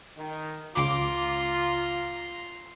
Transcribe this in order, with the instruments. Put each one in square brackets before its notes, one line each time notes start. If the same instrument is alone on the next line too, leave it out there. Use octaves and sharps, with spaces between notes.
[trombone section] D#3
[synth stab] C#2 D6 [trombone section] F4 [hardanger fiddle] A#5 C6